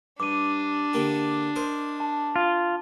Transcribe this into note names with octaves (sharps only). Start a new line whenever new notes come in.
G2 D4 D6 D#7
D3 A#3 G4
A#4 C5 D#5
A5
F4